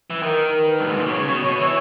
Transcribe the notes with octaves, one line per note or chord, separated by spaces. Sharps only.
E3
D#3 A#4
B4
G2
G#2
A#2
B2
C#3 C#5
B2
B2
E3